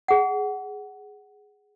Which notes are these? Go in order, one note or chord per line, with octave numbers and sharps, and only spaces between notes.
G#4 F#5